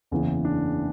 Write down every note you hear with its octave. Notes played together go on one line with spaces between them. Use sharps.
F#1 E2 C#3 E3
D4